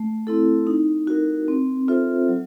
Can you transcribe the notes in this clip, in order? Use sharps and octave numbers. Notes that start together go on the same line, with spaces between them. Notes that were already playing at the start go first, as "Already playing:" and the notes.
Already playing: A3
C4 E4 A4
D#4
F#4 A#4
C4
F4 A4 C5 E5
F#3